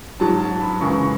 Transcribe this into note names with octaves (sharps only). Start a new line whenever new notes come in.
G#2 F#3 A5
A5
B5
F#2 C#3 E3 G#3 C#6